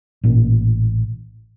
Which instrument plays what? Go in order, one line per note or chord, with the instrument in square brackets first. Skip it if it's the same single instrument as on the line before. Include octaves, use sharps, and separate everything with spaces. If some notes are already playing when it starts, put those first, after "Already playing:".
[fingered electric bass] A1 A#2 A#3